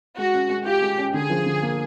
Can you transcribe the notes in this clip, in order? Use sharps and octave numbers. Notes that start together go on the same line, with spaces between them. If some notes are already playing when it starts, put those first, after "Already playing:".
G#3 F#4
C#4
G#3
F4 G4
G#3
C#4
D3 G#4
F3
D3
A#3